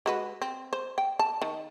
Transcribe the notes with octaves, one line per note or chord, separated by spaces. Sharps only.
G#3 F#4 B4
C4
C5
G5
A5
D#3